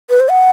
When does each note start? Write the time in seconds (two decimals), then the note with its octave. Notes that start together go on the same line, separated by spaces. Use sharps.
0.10 B4
0.20 C5
0.30 F#5